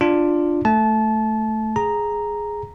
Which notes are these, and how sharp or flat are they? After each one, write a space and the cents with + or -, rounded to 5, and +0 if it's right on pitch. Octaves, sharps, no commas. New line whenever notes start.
D4 +10 F4 +0
A3 +0 A5 -25
G#4 +0 A#5 +0